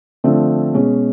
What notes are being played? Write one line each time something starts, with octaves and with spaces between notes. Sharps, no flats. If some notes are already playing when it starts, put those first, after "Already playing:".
D3 F3 A3 C4
B2 G#3 C#4